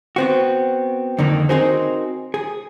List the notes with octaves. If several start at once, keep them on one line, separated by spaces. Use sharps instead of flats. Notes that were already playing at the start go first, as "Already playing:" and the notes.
B3 C4 F#4
F2 D3 D#3 A#3
C4 D#4 F#4 G#4 A#4 C5
G#4